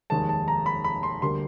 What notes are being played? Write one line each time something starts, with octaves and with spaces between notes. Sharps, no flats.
F1 D#2 D#3 G#3 A5
A5
A#5
B5
B5
C6
D2 D3 G3 A#3 C6